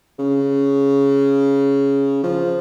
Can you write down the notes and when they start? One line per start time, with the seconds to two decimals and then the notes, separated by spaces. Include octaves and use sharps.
0.19 C#3
2.24 F3